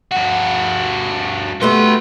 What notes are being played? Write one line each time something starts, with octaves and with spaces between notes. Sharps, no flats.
G2 F#4
G3 A3 B3 F#4 C6